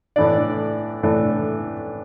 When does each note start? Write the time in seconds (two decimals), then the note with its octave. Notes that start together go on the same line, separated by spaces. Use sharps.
0.16 A2 E3 A3 D4 D5
1.03 A2 E3 A3 D4